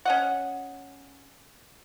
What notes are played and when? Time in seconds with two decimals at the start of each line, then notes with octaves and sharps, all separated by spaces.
0.05 C#4 D#5 F#5